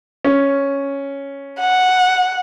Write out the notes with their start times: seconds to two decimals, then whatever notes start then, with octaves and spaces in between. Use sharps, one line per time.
0.25 C#4
1.60 F#5